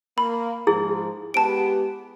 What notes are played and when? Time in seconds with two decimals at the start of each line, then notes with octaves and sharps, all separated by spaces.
0.18 A#3 B5
0.67 G#2 F3 E4 G#4
1.34 G#3 B3 G4 A5 D7